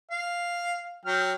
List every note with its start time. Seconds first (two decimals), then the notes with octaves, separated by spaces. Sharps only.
0.11 F5
1.05 F#3 G5 F6